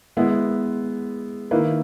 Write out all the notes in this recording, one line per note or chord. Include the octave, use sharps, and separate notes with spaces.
G#3 B3 E4
D#3 A#3 E4 B4